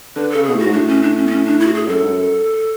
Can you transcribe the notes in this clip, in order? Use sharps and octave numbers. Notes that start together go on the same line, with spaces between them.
D3 B4
A4
C#3
B2 G#4
A2 F#4
G#2
A2 D4
C#4
D4
C#4
B3
C#4
D4
E4
F#4
G#4
F#2 A4
G#2
F#2